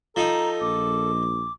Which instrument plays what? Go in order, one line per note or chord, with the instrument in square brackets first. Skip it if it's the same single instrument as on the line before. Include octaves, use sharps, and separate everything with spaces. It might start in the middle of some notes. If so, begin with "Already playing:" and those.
[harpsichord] F3 D#4 [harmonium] A4 [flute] A#5
[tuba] A#1 [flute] D6